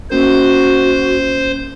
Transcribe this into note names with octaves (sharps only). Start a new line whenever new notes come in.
A#3 C#4 F#4 A#4 C5